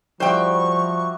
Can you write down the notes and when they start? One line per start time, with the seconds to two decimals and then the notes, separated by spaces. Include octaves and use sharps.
0.20 F3 G3 E4 F#4 C5 G5 C#6